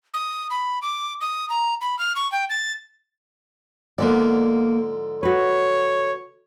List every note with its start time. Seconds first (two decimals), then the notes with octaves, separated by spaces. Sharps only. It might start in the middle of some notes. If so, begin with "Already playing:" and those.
0.14 D#6
0.50 B5
0.82 D6
1.21 D#6
1.50 A#5
1.81 B5
1.99 F6
2.16 C#6
2.32 G5
2.50 A6
3.98 G#2 D3 F3 A#3 B3 D5
5.23 F#4 B4 C#5